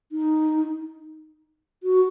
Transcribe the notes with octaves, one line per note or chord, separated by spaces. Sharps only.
D#4
F#4